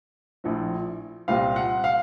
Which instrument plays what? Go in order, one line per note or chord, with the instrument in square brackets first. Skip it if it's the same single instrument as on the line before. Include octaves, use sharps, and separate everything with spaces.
[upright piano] A#1 A2 F3
C2 A#2 G3 C4 F5
F#5
F5